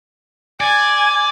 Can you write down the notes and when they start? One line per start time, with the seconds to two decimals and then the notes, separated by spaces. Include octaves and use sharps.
0.60 D5 G#5